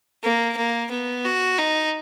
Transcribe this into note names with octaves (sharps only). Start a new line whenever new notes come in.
A#3
A#3
B3
F#4
D#4